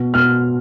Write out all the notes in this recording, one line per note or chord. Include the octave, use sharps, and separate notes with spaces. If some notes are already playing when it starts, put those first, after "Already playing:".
Already playing: B2
B2 F6